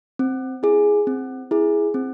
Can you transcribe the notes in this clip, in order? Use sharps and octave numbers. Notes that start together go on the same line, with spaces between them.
C4
E4 G#4
C4
E4 G#4
C4